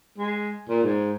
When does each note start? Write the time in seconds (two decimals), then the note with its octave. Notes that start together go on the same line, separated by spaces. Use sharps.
0.19 G#3
0.69 A#2
0.84 G#2